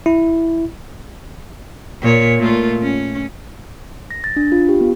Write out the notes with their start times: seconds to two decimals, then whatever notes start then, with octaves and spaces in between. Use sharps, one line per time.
0.06 E4
2.01 A#2 C#5
2.38 A#2 A3 F4
2.82 C#4
4.11 A#6
4.24 A6
4.36 D4
4.52 F4
4.69 G4
4.81 B3